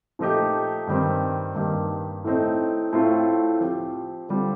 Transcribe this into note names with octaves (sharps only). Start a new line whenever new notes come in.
A#2 F3 A3 D#4 G4
G2 D#3 G3 C4
G2 D#3 A#3 D#4 G4
A2 A3 C4 D#4
A2 A3 C4 F4
F3 C4 G4
D3 G3 C4 F4